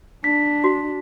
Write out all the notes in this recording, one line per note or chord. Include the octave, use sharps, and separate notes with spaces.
D4 B6
F#4